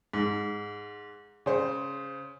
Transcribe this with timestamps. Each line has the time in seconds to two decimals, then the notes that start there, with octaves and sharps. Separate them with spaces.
0.13 G#2
1.46 C#3 C5